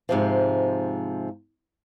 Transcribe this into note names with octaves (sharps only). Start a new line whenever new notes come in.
G#2 C3 F3